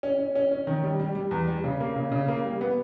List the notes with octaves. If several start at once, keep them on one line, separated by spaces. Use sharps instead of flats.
C#4
C#4
C#4
C#4
D#3
G3
G3
G3
E2
G3
C#3
A#3
C#3
C#3
A#3
G3
B3